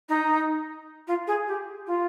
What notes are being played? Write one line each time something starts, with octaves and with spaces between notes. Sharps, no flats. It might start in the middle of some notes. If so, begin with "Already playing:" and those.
D#4
F4
G#4
G4
F4